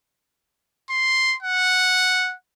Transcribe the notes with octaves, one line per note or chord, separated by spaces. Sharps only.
C6
F#5